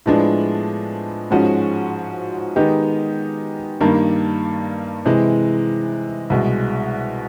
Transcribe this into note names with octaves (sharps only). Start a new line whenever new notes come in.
A2 F3 G#3 B3 D4
G#2 F3 G#3 C#4 F#4
D#3 G#3 B3 D#4 G4
G2 D#3 G3 A#3 D4
C3 E3 G#3
C2 B2 G#3